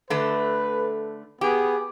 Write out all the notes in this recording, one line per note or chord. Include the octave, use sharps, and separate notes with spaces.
D3 A3 B4
B3 G4 G#4